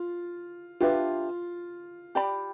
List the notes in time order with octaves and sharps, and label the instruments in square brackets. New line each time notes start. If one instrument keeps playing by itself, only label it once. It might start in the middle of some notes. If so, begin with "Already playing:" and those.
Already playing: [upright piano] F4
[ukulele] D4 G4 B4 E5 [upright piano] F4
[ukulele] G4 D5 G5 B5